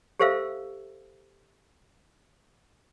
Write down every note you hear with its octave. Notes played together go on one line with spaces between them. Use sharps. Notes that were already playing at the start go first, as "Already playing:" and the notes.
G4 A4 C5 E5 F5 E6